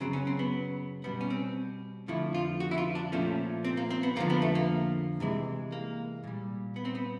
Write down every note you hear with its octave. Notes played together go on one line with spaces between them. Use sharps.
F#2 C#3 F#3 C4
C#4
C4
B3
B2 G3 B3
C#4
C4
F2 D3 F3 A3 E4
F4
F#4
E4
F4
D4
A#2 F3 A3 C#4
C4
A#3
C4
B3
F2 D3 F3 A#3
B3
A3
A#3
C3 E3 G#3
A#3
A#2 G3
B3
C4
B3